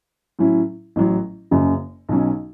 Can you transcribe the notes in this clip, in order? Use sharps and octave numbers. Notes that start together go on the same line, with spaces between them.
A2 F#3 C#4 E4
A1 A2 F#3
F#1 F#2 C#3
B1 B2 F#3 C#4